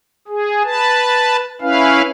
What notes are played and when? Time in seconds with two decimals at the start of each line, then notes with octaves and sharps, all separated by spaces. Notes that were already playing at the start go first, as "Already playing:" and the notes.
0.28 G#4
0.64 B4 A5
1.61 C#4 E4 B4 F5